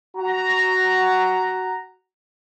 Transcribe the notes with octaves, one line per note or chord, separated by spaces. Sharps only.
F#4 A#5